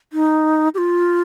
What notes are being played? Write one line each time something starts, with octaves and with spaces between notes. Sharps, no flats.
D#4
G4
F4